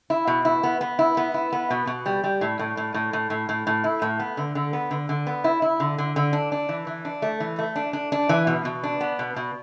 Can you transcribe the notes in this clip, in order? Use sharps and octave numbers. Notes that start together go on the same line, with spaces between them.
E4
B2
E4
B3
B3
E4
B3
E4
B3
B2
B2
G3
G3
A2
A2
A2
A2
A2
A2
A2
A2
E4
A2
B3
D3
D3
B3
D3
D3
B3
E4
E4
D3
D3
D3
D4
D4
E3
E3
D4
A3
E3
A3
D4
D4
D4
E3
B2
B2
D4
B3
B2
B2